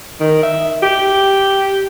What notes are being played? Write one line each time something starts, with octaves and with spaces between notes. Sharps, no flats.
D#3
E5
G4